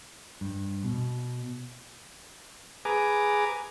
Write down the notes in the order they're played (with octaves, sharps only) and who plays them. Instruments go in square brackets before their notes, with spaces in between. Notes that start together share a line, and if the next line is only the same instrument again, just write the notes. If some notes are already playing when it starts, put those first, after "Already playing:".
[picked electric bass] G2
B2
[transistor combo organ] G#4 B4 G#5 A#5 D6